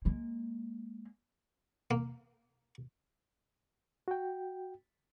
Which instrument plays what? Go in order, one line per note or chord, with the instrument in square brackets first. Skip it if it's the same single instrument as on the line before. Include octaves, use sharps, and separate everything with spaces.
[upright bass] G#3 A#3
[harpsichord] A#3
[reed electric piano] F#4 G5